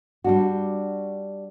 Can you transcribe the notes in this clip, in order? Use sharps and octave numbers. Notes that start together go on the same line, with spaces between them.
G3 D4 F#4